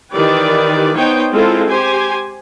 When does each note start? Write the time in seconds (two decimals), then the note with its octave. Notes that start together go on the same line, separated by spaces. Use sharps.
0.13 D#3 E3 G4 B4 D5
0.95 B3 D#4 C5 C#5 G5
1.32 G#3 C4 E4 F4 A4
1.69 G4 C5 G#5